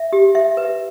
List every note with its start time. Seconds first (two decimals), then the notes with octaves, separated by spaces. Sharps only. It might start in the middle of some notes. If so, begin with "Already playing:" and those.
Already playing: E5
0.13 G4
0.35 E5
0.57 B4